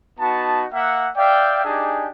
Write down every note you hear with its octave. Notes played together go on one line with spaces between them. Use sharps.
B3 D#4 F#4 A5
A#3 E5 F#5
D5 E5 F5 G5
D4 D#4 G4 G#4 G#5